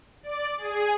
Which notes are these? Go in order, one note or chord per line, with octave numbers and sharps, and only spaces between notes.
D5
G#4